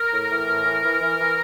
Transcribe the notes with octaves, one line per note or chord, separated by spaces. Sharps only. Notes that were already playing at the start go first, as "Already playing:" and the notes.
Already playing: A#4
A2
E3
A2
E3
E3
E3
E3